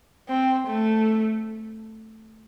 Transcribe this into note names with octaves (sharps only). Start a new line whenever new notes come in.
C4
A3